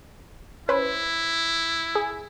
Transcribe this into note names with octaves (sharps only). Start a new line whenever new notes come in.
C#4 E4 B4 C5
G#4